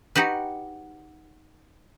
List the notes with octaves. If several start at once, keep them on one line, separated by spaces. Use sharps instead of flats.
D#4 F#4 G4 B4